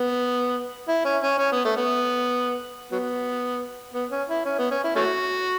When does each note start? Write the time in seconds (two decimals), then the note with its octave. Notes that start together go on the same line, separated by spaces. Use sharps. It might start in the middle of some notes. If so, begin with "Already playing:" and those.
Already playing: B3
0.88 E4
1.05 C#4
1.22 C#4
1.38 C#4
1.52 B3
1.64 A3
1.76 B3
2.92 F#3 B3
3.94 B3
4.11 C#4
4.28 E4
4.45 C#4
4.58 B3
4.71 C#4
4.84 E4
4.96 A3 C#4 F#4